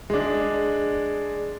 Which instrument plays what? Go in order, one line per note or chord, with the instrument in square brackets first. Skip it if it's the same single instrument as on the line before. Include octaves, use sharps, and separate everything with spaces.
[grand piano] G#3 D4